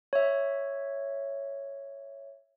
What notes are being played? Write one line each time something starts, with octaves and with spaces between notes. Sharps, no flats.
C#5 E5